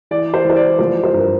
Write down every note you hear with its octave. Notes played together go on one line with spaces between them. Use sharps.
E3 D5
C5
E3
C5
D5
F3 C5
C5
G2 A#4